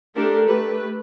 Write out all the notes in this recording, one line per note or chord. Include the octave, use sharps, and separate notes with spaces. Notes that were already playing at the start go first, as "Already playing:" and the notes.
A3 D4 G4 A4 A#4
A3 G4 B4